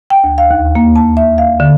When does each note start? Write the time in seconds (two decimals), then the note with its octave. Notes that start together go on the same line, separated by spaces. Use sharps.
0.10 G5
0.24 D2
0.38 F5
0.51 D#2
0.75 A#3
0.96 A5
1.17 E5
1.38 F5
1.60 D3